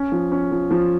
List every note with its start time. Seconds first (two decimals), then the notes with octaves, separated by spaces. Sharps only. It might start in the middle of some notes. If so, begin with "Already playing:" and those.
Already playing: C#4
0.12 F3
0.32 C#4
0.51 F3
0.71 F3